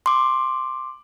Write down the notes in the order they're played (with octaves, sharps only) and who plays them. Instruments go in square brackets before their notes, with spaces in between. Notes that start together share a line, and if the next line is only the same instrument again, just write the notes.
[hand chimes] C6 D6